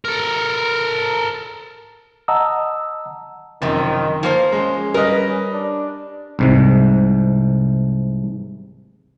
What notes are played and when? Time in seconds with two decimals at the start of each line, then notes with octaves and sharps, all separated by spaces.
0.05 A4 A#4
2.28 D#5 F#5 A5 A#5 D#6 E6
3.62 F#1 C3 D#3 F3
4.23 F3 A#3 C5
4.52 G#3 C#4
4.94 G3 A#4 B4 D#5
5.52 D4
6.39 C2 G#2 C3